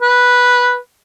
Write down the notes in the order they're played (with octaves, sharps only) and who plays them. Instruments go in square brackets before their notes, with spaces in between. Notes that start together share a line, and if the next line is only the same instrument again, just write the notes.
[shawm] B4